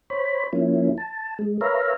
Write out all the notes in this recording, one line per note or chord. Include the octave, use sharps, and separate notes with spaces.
C5 C#5 B5
F3 A#3 C#4 E4
A5
G#3
A#4 B4 C#5 E5 F5 A#5